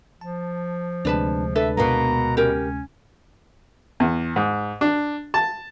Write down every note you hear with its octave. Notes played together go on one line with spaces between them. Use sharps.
F3 A5
D2 C3 G#3 D4 B4 A5
D4 A4 B4 E5
B2 A#3 B3 A#5
C#4 G4 A#4
E2
G#2
D4
A5